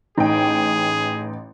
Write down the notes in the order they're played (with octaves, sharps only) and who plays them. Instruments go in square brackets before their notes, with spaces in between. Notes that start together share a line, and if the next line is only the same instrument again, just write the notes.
[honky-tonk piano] A1 G5 [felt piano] D#4 [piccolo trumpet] G#4